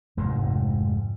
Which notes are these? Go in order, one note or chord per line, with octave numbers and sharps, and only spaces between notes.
F1 D2 G#2 G#3